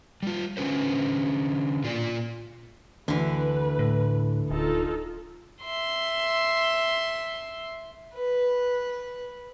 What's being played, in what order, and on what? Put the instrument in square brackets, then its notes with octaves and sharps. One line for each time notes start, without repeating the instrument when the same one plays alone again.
[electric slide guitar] G3 F4
D3 C#4 B4 C5
A#2 F4 D5
[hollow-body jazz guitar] D2 [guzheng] D3 E3 [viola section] B4
[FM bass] A2
[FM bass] D1 [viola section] D#4 F4 A4
[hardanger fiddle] E5 C6
B4